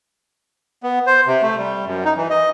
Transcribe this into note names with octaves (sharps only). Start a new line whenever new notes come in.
B3
C5
C3
A3
G3
F#2
D#4
E3
D#5